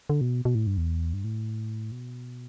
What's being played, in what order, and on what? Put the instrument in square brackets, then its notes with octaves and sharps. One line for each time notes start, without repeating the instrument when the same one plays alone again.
[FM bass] D3
B2
B2
A2
G2
E2
G2
A2
B2